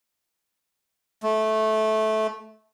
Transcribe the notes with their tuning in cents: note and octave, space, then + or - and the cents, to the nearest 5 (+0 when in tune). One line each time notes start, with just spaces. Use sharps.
A3 -15